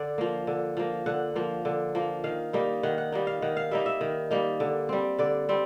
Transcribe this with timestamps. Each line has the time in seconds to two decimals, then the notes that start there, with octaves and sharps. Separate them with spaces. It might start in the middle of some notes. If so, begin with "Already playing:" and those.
Already playing: D3 D5
0.18 F3 A#3
0.47 D3
0.77 F3 A#3
1.06 D3 F#5
1.35 F3 A#3
1.65 D3
1.95 F3 A#3
2.24 D#3 F5
2.53 G3 A#3 D#4
2.83 D#3 F#5
2.98 F#5
3.12 G3 A#3 D#4
3.27 F5
3.42 D#3 F#5
3.57 F5
3.71 G3 A#3 D#4 E5
3.86 E5
4.01 D#3
4.31 G3 A#3 D#4
4.60 D3
4.89 G3 C4
5.19 D3 D5
5.49 G3 C4